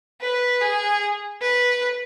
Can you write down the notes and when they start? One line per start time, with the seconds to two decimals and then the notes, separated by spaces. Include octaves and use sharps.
0.21 B4
0.61 G#4
1.41 B4